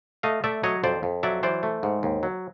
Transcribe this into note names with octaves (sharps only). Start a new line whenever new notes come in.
A3 D#5 F5
A3 D5 E5
F#3 C#5 D#5
F2 C5 D5
F2
F#3 D5 E5
E3 C5 D5
A3
G#2
D#2
F#3